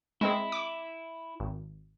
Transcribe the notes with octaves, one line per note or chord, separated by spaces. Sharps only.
G#3 C4 E4 G#4
D6
G#1